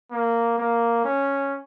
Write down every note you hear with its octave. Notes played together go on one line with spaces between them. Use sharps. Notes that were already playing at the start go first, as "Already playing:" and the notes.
A#3
A#3
C#4